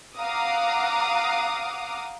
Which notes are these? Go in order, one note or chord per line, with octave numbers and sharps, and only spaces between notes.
F5 F#5 A#5 D6 D#6